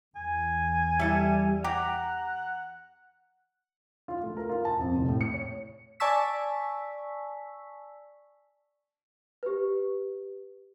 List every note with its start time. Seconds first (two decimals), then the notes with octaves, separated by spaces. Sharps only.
0.16 E2 G#5
1.00 G3 E4 A4 E5
1.64 G4 F#5 A#5
4.08 F4
4.23 A3
4.37 A#4
4.49 F4
4.65 A5
4.79 F2
4.97 F1
5.09 A2
5.21 C#7
5.34 C#5
6.00 D5 G#5 A5 C#6 E6 B6
9.43 G4 B4